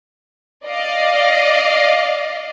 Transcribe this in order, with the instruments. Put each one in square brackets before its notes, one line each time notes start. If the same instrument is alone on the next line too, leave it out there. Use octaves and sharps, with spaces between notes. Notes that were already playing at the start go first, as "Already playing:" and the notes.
[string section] D5 D#5 F5